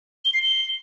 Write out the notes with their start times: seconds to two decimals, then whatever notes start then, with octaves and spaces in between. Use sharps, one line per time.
0.25 G7
0.34 C7
0.42 G7